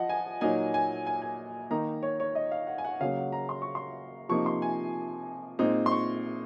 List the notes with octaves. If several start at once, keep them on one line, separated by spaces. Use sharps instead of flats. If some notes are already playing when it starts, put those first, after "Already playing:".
Already playing: F3 D#5 F#5
G#5
A#2 F#3 A#3 D#4 G#5
G#5
G#5
G#5
D#3 A#3 D#4 A#5
C#5
C#5
D#5
F5
F#5
G#5
F#5
C#3 F#3 A#3 F5
F#5
A#5
C6
C#6
C6
C3 F3 A#3 D#4 C#6
C6
G#5
A#2 G#3 C4 D#4
C6
C#6